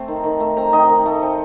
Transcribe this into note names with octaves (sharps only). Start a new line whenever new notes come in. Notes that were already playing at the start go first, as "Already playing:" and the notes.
Already playing: A3 C4 C6
D#3
D#3
A3
C4 A#5
D#3 D#5
D#3
A3
C4